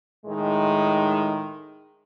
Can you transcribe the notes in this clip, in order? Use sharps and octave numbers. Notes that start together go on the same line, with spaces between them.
A2 D#3 G#3